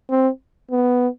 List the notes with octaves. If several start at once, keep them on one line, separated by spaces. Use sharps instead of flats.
C4
B3